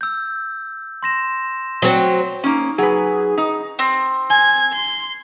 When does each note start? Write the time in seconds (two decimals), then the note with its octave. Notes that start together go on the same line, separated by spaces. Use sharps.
0.01 E6 G6
1.03 C6 A#6 E7
1.82 F#3 C4
2.44 A#3 C#4 D#4
2.78 F#3 G#4 B4
3.38 D#4
3.79 C4
4.30 G#5 G#6
4.73 C6